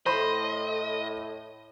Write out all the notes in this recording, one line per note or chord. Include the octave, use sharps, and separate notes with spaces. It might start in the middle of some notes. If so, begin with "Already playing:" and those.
A2 C5 D#5 B5 C6